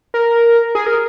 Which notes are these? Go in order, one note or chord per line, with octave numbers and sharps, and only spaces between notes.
A#4
G#4
A#4